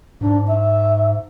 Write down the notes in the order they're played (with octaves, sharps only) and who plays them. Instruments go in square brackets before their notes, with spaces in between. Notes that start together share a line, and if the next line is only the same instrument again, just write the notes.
[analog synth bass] G#2 [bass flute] D4
[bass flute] E5